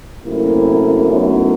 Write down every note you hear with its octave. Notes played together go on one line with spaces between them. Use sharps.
F#2 C3 A3 A#3 E4
F#2 A3 B3 C#4 D#4 E4